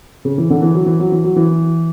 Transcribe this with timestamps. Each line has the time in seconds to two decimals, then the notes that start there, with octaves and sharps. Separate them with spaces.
0.25 C#3
0.38 E3
0.50 D3
0.62 E3
0.74 F#3
0.86 E3
1.00 F#3
1.12 E3
1.24 F#3
1.36 E3